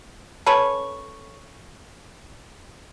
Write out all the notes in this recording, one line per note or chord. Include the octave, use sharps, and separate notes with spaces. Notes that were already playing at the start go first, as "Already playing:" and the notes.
C#4 A4 B4 C#5